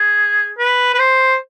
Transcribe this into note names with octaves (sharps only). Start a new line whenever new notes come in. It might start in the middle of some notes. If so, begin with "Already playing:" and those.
Already playing: G#4
B4
B4
C5